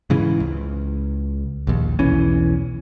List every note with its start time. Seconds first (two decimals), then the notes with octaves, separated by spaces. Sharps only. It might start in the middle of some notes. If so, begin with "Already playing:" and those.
0.10 G#2 C#3 E3
0.40 C#2
1.67 A#1 D#2
1.99 B1 E2 E3 C#4